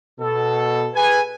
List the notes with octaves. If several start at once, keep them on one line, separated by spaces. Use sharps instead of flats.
B2 A4
G#4 B4 G#5